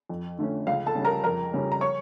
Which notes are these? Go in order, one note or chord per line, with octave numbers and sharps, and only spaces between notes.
F2
D3 A3 C#4
C#2 F5
A4 A5
C#3 G3 C#4
A#4 A#5
F2 A#4 A#5
C#3 G3 C#4
A#5
C#5 C#6